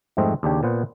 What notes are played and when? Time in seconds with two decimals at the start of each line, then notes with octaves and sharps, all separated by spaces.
0.17 F2 G#2 G3 A3 C4 D#5
0.43 D#2 C#3 D4 G4 C#5
0.63 A#2 B3 C5 F#5